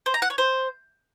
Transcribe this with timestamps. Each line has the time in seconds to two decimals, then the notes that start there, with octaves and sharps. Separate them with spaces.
0.06 C5
0.14 A#5
0.22 F#5
0.30 C#5
0.38 C5